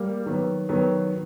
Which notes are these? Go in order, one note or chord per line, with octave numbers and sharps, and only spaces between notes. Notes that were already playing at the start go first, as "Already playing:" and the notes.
Already playing: G3 A#3
D#3 F#3 B3
D#3 F#3 B3